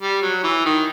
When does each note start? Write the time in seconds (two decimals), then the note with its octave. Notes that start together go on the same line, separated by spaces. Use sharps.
0.02 G3
0.22 F#3
0.44 E3
0.65 D#3